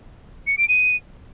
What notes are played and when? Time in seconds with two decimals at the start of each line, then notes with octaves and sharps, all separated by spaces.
0.47 C#7
0.58 D7
0.69 D#7